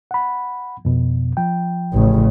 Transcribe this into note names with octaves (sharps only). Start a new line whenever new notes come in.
F#5 B5
F2 B2
F3 G5
A1 C#3